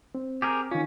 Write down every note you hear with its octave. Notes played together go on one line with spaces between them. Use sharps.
C4
G4 G#4 A#4
D#3 C#4 F4